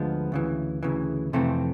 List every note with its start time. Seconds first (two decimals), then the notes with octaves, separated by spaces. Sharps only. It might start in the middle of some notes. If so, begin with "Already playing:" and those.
Already playing: D2 D3 F3 G#3 B3
0.32 D2 C#3 E3
0.83 D2 C#3 E3
1.33 F2 C3 E3 A3 C4